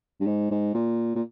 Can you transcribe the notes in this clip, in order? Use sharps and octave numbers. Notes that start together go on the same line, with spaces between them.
G2
G#2
G#2
A#2
A#2